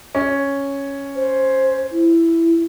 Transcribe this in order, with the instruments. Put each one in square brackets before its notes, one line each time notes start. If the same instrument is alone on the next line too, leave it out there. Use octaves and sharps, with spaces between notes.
[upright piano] C#4
[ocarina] C5
E4